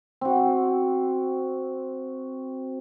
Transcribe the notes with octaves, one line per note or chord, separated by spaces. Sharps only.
C4 F#4